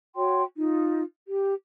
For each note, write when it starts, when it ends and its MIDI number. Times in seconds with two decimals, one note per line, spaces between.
0.16 0.42 66
0.16 0.42 73
0.16 0.42 79
0.16 0.42 84
0.57 1.02 63
0.57 1.02 65
1.26 1.54 67